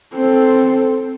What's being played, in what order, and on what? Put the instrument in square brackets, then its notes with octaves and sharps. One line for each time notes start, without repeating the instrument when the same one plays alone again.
[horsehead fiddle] C4 A4